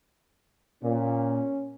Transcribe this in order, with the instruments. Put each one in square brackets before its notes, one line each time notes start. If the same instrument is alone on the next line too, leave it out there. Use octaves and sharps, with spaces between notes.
[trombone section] A#2 [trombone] C#4